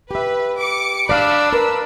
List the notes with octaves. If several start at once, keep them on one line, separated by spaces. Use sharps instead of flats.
G4 B4 E5
D6 C#7
D4 D5 F5 B5 E6
A#4 B4